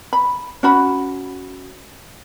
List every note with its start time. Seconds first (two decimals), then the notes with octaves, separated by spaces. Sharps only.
0.13 B5
0.63 C#4 F#4 B5